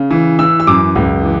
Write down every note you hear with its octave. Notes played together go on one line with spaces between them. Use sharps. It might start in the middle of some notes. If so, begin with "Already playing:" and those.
Already playing: C#3
E3
E3 E6
E6
F#2 D6
C#2
E3